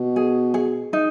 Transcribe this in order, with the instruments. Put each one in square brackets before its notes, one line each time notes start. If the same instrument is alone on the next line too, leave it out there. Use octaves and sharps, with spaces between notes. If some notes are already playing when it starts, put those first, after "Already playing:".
Already playing: [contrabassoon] B2
[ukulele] G#4
G#4
D#4